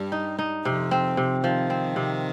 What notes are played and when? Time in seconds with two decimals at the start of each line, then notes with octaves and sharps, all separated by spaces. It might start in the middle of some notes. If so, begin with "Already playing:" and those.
Already playing: G2 G3
0.12 D#4
0.39 D#4
0.65 F2 C3 F3
0.91 C4
1.17 C3
1.43 D#3 F3
1.70 C4
1.96 C3